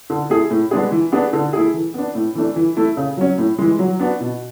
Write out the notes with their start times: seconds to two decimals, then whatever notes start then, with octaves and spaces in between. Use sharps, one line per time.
0.10 D3
0.30 A3 E4 G#4
0.51 A2
0.71 G#3 B3 D4 G#4
0.91 E3
1.12 B3 D4 G#4
1.33 D3
1.53 A3 E4 G#4
1.74 E3
1.94 B3 D4
2.15 A2
2.35 E3 A3 D4
2.56 E3
2.77 A3 E4
2.97 C#3
3.17 F#3 C#4
3.38 A2
3.58 E3 G#3
3.79 F#3
4.00 B3 D4 F#4
4.20 B2